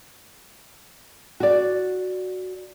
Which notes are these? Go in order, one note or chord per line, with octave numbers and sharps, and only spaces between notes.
F#4 D5